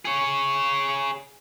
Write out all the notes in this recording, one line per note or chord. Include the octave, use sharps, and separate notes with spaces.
G#4 C#5